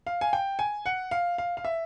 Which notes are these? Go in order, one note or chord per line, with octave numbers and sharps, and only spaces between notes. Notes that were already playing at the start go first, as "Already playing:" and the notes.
F5
G#5
G5
G#5
F#5
F5
F5
F5
E5